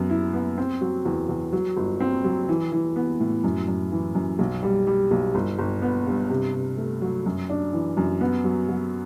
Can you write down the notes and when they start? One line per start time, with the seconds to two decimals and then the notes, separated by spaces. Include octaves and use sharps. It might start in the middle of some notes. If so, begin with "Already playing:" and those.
Already playing: F#2 B3
0.10 E4
0.33 B3
0.58 C4
0.81 F#3
1.05 E2
1.29 E2
1.52 F#3
1.77 G1
2.00 C4
2.24 F#3
2.49 E3
2.72 E3
2.96 B3
3.20 A2
3.44 F#2
3.68 F#2
3.92 E3
4.15 F#2
4.39 B1
4.63 G3
4.87 G3
5.11 B1
5.35 G1
5.59 G1
5.82 B3
6.07 G2
6.30 C3
6.53 C3
6.77 A3
7.02 F#3
7.26 F#2
7.50 D4
7.73 E3
7.97 F#2
8.21 B3
8.44 F#3
8.68 F#3